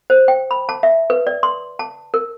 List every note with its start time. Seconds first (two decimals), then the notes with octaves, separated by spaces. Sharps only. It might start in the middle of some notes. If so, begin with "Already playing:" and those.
0.10 C5
0.28 G5
0.51 B5
0.69 A5
0.83 E5
1.10 B4
1.27 D5
1.43 C6
1.79 A5
2.14 A#4